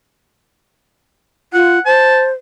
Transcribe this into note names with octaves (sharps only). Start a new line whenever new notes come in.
F4 F#5
C5 A5